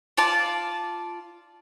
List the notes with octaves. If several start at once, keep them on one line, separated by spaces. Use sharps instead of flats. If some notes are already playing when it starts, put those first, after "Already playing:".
F4 D5 A5